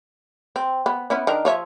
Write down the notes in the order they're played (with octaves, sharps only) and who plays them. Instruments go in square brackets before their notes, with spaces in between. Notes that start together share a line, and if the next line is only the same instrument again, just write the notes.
[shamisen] C4
B3
B3 C#4 E4
D#3 D4 A#4
F3 C#5 E5